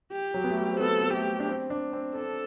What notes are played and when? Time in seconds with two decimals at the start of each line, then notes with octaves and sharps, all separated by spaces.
0.12 G4
0.34 F#3
0.44 B3
0.50 A3
0.57 G3
0.73 C4
0.80 B3 A4
1.01 B3
1.13 A3 G4
1.40 D4
1.48 C4
1.70 D4
1.93 C4
2.15 D4 A4